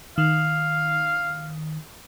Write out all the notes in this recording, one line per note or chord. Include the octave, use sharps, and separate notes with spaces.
D#3 F5